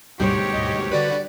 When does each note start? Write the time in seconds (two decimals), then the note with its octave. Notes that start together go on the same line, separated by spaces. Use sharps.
0.20 D2 G#2 B2 G3 D4 G4 C5 C#5
0.52 D#5
0.92 D3 F#4 B4 D5